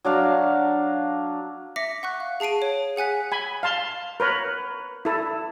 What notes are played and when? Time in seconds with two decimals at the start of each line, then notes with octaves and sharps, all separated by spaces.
0.04 F#3 D4 F5
1.76 E5 D6 A#6 B6 C#7
2.03 F#5 C#6 F#6
2.20 F5
2.40 G#4 A5 C7 D7 D#7
2.62 C#5
2.96 G#4 F#5 G#5 F#6 B6
3.32 G#5 B5
3.63 F5 A5 C6
4.20 A#4 B4 C#5
5.05 E4 A4